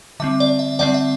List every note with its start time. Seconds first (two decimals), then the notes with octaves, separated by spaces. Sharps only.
0.20 D3 G3 C4 E5
0.40 D5
0.59 E5
0.79 D3 G3 C4 D5 F#5
0.94 E5